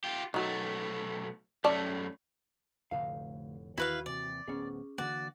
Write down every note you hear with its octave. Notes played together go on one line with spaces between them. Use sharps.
F4 G4
B1 D#3 F#3 A3
F#2 A3 C#4 D5 A5
F1 D2 A2 D3 F5
D#2 D#3 E3 E4 F#4 B4 F5
D#2 C3 E3 D5
D1 B3 C#4 G#4
D3 E3 A#3 F#4 D5